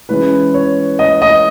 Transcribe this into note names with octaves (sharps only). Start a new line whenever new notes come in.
E3 G#3 C#4 E4 B4
C#5
D#5
D#5